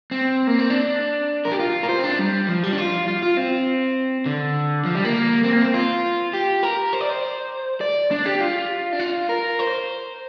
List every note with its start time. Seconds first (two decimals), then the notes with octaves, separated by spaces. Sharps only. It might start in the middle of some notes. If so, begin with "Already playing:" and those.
0.11 C4
0.47 A#3
0.59 C4
0.70 D4
1.45 A#4
1.52 G4
1.59 F4
1.83 A#4
1.89 C5
1.99 C4
2.04 D4
2.19 G3
2.49 F3
2.64 G3
2.73 D4
2.78 F4
3.08 F4
3.23 F4
3.37 C4
4.26 D3
4.85 F3
4.95 G3
5.05 A#3
5.44 C4
5.53 A#3
5.61 C4
5.74 F4
6.33 G4
6.63 A#4
6.93 C5
7.01 D5
7.10 C5
7.81 D5
8.11 D4
8.26 G4
8.41 F4
8.93 D4
9.00 F4
9.29 A#4
9.59 C5